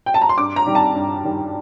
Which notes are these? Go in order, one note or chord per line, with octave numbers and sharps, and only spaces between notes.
G5
A5
A#5
C6
G2 D6
A#5
D#3 G3
A5
G2
D#3 G3